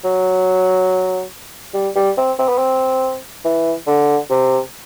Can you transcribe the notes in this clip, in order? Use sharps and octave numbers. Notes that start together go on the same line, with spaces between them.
F#3
G3
G3
C4
C4
B3
C4
E3
D3
C3